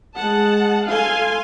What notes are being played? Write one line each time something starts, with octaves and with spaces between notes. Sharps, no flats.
G#3 F#5 A5
A4 F5 G#5 C6